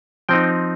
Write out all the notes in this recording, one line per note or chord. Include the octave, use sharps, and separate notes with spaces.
F3 C4 D#4 G5